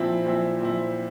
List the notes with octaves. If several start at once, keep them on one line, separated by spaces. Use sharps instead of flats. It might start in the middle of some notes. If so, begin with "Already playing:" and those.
Already playing: A#2 F3 C4 E4
A#2 F3 C4 E4
A#2 F3 C4 E4